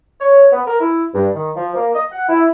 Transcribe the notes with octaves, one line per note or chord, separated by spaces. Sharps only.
C#5
B3
A#4
E4
G2
D#3
F3
A#3
D#5
F#5
E4